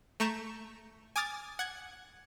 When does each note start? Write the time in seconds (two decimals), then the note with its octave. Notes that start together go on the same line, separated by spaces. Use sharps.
0.20 A3 A#5 C#6 G6 E7
1.16 G#5 D6 D#6 F6 A6
1.59 F#5 G#6